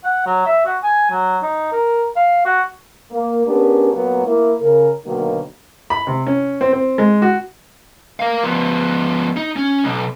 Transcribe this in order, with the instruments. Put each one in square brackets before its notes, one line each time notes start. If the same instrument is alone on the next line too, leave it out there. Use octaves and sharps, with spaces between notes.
[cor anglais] F#5
F#3
E5
F#4
G#5
F#3
D#4
A#4
F5
F#4
[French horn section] A#3
B3 C#4 D4 G4 G#4 A#4
A#2 F#3 A#3 B3
A#3 E4
C#3 A#4
B2 D3 D#3 F#3 A#3
[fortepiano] B5
C3
C#4
C4
C4
G#3
F#4
[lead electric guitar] A#4 F5
F3 B3
D#4
C#4
B1